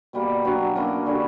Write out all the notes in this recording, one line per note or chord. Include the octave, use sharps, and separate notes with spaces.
B2 G3 A#3
F#3 B3 D4 F#4
A#3 C#4 E4 A#4
D3 G3 C#4 F#4